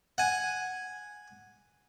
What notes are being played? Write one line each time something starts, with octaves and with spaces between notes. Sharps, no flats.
F#5 G#5